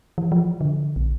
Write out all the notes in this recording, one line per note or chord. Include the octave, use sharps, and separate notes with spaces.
E3
F3
D3
A#1